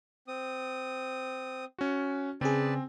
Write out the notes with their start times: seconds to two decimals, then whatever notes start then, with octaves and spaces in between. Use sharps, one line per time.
0.28 C4 D#6
1.79 C#4 F#4
2.41 C#3 C4 G#4 B4 D5 A5